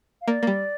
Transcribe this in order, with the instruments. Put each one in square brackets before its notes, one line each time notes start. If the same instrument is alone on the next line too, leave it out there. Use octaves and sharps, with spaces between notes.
[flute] F5
[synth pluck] A#3 [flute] D5
[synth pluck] A#3
G3